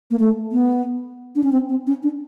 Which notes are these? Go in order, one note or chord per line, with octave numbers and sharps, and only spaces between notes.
A#3
A3
B3
D4
C#4
C4
C4
C#4
D4